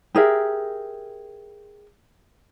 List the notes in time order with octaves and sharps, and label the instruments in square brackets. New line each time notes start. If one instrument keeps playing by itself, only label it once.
[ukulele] G4 G#4 A#4 E5